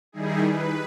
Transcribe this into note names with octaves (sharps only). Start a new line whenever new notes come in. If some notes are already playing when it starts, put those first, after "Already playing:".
D#3 G3 D#4 E4 G#4
B4